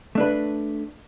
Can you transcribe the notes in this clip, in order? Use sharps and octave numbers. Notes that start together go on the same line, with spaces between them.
A3 D4 B4